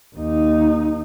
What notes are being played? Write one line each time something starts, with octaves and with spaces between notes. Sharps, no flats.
D#2 D#4